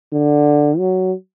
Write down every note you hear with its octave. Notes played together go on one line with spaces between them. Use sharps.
D3
F#3